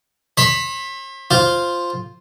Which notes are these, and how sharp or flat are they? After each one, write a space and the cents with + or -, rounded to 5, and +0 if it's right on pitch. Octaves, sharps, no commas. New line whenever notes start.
C5 +45 B5 +0
F4 +0 C5 +0